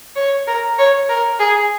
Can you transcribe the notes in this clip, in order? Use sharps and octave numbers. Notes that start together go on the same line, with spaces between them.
C#5
A#4
C#5
A#4
G#4